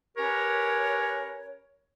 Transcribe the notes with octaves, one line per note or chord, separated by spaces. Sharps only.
C#4 G4 A#4 B4 C#5